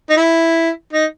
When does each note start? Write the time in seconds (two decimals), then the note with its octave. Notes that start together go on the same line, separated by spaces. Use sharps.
0.09 D#4
0.17 E4
0.93 D#4